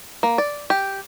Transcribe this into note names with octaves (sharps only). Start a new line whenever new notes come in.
A#3
D5
G4